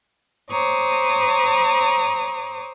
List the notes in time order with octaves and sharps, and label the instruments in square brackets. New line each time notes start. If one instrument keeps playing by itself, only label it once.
[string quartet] C5 C#5 A#5 D6 D#6